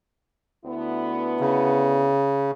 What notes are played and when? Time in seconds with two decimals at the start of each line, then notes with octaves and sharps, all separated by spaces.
0.65 D2 B3 E4
1.40 C#3